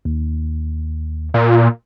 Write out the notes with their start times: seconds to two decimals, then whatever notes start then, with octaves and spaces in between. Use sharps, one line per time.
0.05 D#2
1.34 A#2